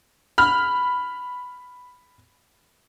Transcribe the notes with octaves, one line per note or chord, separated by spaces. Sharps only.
B5 F6